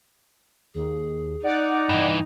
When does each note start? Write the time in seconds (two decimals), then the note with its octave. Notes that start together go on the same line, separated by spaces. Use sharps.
0.75 D#2 G#4
1.43 D#4 D5 F#5 D6
1.89 G2 E3 D#5